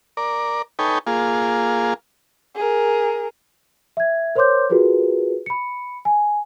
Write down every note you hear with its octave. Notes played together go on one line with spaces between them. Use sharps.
A#4 D5
D#4 A4 B4 C#5 G5 G#5
A#3 F4 G#4
G#4 A#4
E5 G#6
A#4 C5 C#5 C6 D6 G6
F4 F#4 G#4 A#4 B4
B5 C#7
G#5